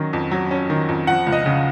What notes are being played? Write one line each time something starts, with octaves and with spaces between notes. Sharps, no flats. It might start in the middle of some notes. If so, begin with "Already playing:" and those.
Already playing: D#3 F#3 C#4
F2
F#3
C#4
D#3
F2
F3 F#5
C#2
D#5
C#3